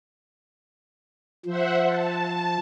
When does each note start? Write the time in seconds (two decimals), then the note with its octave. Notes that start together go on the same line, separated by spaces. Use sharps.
1.46 F3 C5 E5 F#5
1.86 A5